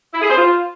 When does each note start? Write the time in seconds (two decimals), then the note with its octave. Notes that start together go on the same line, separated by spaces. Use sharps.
0.14 E4
0.22 G#4
0.30 C5
0.38 F4